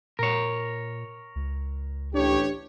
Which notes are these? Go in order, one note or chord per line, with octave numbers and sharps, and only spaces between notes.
A#2 A#4 C#5
C#2
A1 D4 G4 C#5